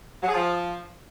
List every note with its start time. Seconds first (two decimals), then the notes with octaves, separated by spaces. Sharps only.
0.23 F#3
0.28 G#4
0.34 F3